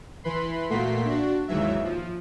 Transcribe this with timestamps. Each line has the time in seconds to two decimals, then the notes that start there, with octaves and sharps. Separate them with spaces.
0.24 E3 B4 B5 C6
0.69 A#2 A3 A#3 F#4 C6 B6
1.05 D4 F#4
1.48 D#2 G#2 E3 F#3 E5
1.84 F3